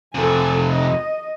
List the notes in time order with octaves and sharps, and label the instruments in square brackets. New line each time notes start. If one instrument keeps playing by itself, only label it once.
[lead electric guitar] F2 C3 [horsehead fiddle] A4 G#5
[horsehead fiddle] D#5